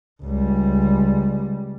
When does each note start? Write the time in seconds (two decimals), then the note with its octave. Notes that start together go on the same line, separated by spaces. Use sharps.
0.23 C#2 G3